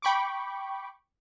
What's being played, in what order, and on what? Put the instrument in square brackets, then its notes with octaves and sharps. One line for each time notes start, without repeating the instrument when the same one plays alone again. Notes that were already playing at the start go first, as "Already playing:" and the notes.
[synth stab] G5 B5 C#6 D6